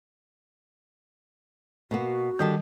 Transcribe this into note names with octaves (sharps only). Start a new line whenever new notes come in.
B2 A#3 B3 F#4
D3 D#3 G3 G4 A5